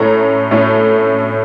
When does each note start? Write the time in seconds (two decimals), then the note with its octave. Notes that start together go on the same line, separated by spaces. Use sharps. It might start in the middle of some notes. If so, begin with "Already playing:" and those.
Already playing: A2 A3 C#4 A#5
0.51 A2 A3 C#4